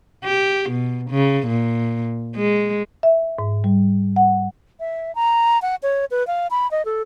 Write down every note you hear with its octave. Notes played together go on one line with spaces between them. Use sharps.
G4
B2
C#3
A#2
G#3
E5
G#2
G3
F#5
E5
A#5
F#5
C#5
B4
F5
B5
D#5
A4